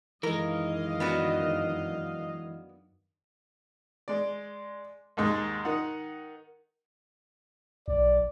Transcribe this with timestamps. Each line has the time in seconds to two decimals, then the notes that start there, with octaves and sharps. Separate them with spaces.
0.23 F#2 D#3 E3 G#3 A#4 D#5 F5
1.00 B3 D4 F#4
4.08 G#3 D5
5.17 D#2 G#2 G#3
5.65 D#3 D#4 F#5
7.88 B1 D5